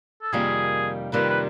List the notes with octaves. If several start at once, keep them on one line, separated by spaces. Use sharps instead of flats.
A4
F2 C3 D#3 G3 A#3 G#4
F2 C3 D#3 G3 A#3 B4
B4